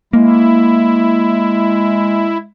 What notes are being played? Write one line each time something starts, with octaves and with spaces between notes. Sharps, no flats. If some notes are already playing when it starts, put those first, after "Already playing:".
G#3 A#3 E4